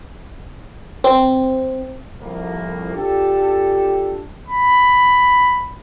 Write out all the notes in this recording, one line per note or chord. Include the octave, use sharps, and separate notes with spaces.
C4
C2 F2 A#3
D4 F4 G4 A4
B5